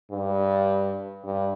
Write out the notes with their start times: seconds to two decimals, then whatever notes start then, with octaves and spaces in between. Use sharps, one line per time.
0.11 G2
1.24 G2